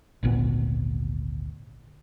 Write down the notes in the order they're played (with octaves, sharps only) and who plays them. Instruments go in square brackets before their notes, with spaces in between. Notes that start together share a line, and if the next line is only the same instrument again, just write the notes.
[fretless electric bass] G#1 D2 A#2 B3